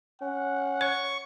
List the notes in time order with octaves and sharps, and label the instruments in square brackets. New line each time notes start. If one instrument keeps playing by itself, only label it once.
[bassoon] C#4 [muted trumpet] F#5
[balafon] C#5 [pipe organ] C#6